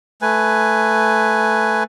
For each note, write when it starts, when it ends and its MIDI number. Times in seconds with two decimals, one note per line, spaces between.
0.22 1.83 57
0.22 1.83 71
0.22 1.83 80